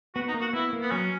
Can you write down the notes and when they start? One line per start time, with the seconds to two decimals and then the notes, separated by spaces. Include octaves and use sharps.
0.15 B3 F#4
0.28 D#4
0.34 A#3
0.41 F#4
0.53 B3 E4
0.73 A#3
0.81 B3
0.91 F#3 C#4